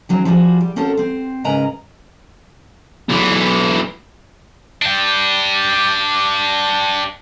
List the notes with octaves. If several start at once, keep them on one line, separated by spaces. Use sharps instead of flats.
D#3 F#3 C4 C#4
F3 G3 E4 F#4 G#4
G3
C4 C#4 F#4 A4 A#4
C4 C5
G#2 C#3 A#4 B4 D#5 A#5
B1 E3
D4 G4